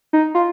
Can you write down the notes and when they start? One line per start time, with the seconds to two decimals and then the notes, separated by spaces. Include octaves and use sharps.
0.13 D#4
0.35 F4